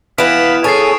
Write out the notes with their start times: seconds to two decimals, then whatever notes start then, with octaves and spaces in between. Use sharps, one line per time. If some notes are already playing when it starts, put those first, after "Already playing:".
0.18 E3 B3 F5 B5 D#6 D7 E7
0.64 G#4 A4 C#5 G#5 D#6 A6 C7